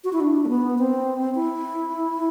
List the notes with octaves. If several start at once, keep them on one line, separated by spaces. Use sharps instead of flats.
F#4
E4
D4
A3
B3
C4
E4